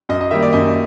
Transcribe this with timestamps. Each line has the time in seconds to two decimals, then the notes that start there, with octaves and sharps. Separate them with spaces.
0.09 F#2 D#5
0.21 D#5
0.31 D#3 G3 A#3 E5
0.42 D5
0.53 F#2 D#5